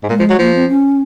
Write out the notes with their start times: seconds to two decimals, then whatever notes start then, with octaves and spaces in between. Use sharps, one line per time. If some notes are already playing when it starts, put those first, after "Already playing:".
0.03 G#2
0.09 A#2 G#3
0.19 F3
0.30 F#3
0.39 F3 A#3
0.55 C4
0.69 C#4